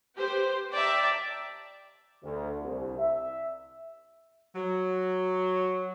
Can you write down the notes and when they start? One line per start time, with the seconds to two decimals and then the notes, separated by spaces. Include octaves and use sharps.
0.17 G4 B4 C5
0.73 D5 E5 G5 A5 A#5
2.23 D2
2.62 C2
2.99 E5
4.56 F#3